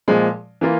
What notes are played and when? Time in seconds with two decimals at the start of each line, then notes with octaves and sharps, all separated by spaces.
0.08 A#2 F3 G#3
0.61 E3 A#3 F4